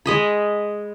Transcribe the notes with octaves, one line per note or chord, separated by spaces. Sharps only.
G#3 D#5 B5